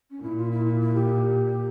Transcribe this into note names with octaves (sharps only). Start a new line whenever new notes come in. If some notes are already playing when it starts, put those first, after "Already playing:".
C#4
A#2 E4
F4
E4
E4
E4
G4